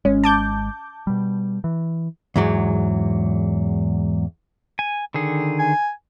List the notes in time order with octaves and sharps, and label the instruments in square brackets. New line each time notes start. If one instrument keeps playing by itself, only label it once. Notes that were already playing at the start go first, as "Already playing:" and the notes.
[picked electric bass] G#1 G#3 [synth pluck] C#4
[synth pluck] A5 D6 G6
[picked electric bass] B2 G3
E3
[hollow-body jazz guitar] E2 G#2 F#3
[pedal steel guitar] G#5
D3 D#3 G#4
[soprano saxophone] G#5